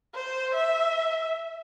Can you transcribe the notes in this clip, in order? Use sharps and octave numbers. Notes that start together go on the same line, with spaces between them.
C5
E5